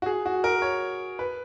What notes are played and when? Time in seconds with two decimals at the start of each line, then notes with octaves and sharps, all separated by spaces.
0.02 F#4
0.06 G#4
0.25 F#4
0.44 A#4
0.62 C#5
1.19 B4